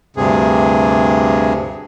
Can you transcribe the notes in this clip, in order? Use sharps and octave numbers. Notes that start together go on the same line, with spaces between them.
D2 G2 C3 G#4